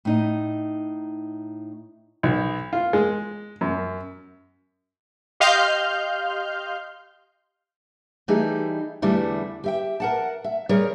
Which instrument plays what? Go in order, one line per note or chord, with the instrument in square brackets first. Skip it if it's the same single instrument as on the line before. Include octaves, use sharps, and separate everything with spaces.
[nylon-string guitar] A2 D#4 D#5
[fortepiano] B1
F4
G#3
F#2
[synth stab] G4 D#5 F5 C6 F6 G6
[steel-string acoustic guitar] E3 G3 A3 D#4 G4 G#4
E2 D3 G3 A3 E4
G4 E5 G5
A#4 F#5 A5
E5
G3 G#4 A#4 C#5